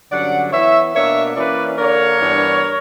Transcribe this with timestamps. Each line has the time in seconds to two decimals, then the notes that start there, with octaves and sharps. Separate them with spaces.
0.11 G2 D3 F#3 C#4 D5 F#5
0.52 E3 B3 E4 C#5 E5
0.94 B2 A#3 D4 C#5 E5
1.36 E3 A#3 C#4 E4 B4 D5
1.77 D3 A#3 D4 A#4 C#5
2.19 G2 E3 B3 D4